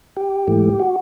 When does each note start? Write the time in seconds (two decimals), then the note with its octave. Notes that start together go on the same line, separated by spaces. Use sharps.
0.17 G4
0.47 G#2 E3 A3
0.79 F#4